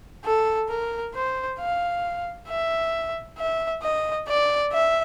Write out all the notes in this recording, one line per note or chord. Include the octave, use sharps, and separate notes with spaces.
A4
A#4
C5
F5
E5
E5
D#5
D5
E5